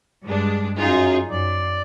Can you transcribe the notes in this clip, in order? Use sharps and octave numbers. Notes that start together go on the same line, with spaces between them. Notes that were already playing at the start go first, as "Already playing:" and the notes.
G2 G#3 D4
F#2 D#4 F4 G#4
F#2 D5